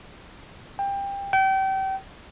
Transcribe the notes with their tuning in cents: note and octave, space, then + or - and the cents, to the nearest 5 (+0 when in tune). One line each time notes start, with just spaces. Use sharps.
G5 +25
G5 -30